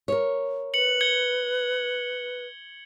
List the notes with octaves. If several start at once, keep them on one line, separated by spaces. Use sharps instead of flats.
A#4 C#5
B4 C#7 F#7
G#6 C#7 G7